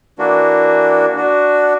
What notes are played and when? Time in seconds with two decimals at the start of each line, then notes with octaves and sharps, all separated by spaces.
0.19 E3 A#3 D4 F#4
1.17 D4 F#4